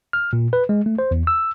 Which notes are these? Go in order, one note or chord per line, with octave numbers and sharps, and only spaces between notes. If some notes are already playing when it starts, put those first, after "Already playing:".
F6
A#2
B4
G#3
A3
C5
E2
E6